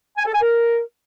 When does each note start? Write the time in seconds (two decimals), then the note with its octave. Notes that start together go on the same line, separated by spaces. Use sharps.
0.17 G#5
0.25 A4
0.33 G#5
0.41 A#4